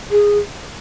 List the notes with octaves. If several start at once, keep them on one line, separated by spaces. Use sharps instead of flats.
G#4